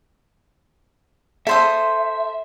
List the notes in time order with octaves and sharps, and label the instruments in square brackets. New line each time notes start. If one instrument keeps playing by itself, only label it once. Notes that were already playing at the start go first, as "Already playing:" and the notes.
[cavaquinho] A4 C5 D#6 [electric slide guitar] E5